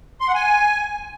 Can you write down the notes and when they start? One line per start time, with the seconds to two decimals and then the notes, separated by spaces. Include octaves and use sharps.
0.21 C6
0.28 F#5
0.34 G#5